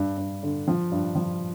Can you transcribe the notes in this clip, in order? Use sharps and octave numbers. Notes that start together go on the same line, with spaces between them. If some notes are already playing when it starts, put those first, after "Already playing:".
Already playing: G2
G2
D3
F3
G2
F3